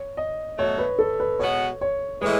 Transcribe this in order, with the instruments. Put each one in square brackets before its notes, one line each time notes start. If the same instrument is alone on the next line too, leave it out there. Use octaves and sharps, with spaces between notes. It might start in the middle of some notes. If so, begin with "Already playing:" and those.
Already playing: [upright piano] C#5
D#5
[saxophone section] B2 F#3 A3 [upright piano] C#5
[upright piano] B4
A4
B4
[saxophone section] B2 G#3 B3 F#4 [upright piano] C#5
[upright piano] C#5
[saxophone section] A2 E3 G#3 [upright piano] B4